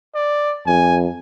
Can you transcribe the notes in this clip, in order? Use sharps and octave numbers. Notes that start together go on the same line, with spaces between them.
D5
F2 G#5